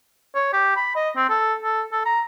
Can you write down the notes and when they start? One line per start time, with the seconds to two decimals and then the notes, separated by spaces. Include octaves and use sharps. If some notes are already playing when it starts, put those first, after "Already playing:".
0.35 C#5
0.53 G4
0.76 B5
0.96 D#5
1.16 C4
1.30 A4
1.63 A4
1.92 A4
2.06 A#5